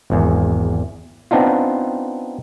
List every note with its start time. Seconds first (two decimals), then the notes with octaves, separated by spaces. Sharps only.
0.10 G#1 E2
1.31 B3 C4 D4 D#4 F4